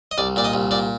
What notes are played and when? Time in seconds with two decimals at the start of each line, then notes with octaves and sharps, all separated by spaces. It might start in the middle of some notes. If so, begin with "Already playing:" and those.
0.11 D#5
0.18 C2 D5
0.36 A#2 D5
0.44 D#5
0.54 C2
0.71 A#2 D5